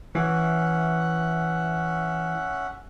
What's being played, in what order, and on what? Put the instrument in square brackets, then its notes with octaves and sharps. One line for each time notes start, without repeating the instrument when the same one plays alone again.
[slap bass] E3 [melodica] C#4 E5 F#5